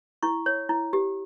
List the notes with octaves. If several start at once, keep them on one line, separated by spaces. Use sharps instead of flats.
E4 C#6
C#5
E4
G4